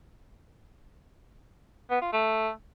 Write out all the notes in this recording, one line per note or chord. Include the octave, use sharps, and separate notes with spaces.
B3
F4
A3